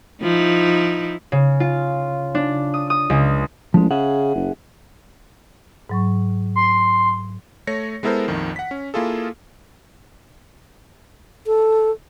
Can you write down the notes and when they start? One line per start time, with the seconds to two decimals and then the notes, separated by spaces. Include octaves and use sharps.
0.22 F3 D#4 E4
1.32 C#3
1.60 F4
2.35 D4
2.74 D#6
2.90 D#6
3.10 C#2
3.74 A1 F3 G#3
3.91 C#3 G#4 E5 F#5
4.35 F#1
5.89 G#2 F#3 C#6
6.56 C6
7.67 A3 C#5 A#6 C#7
8.03 G#3 B3 E4 A4 A#4 C5
8.28 A#1 F2 D#3
8.56 F#5 B6
8.71 C#4
8.94 A#3 E4 F4 G#4 A4
11.47 A4